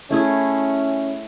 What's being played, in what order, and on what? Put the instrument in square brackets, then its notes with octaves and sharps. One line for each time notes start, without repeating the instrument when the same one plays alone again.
[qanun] A3 E4 G#4 [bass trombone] C#4